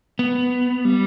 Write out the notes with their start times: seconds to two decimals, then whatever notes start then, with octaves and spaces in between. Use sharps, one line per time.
0.19 B3
0.85 G3